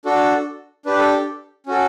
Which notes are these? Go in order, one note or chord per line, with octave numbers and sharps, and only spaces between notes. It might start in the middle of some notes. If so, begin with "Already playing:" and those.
D4 F#4 A4
D4 G4 B4
A4
C#4 F#4 A4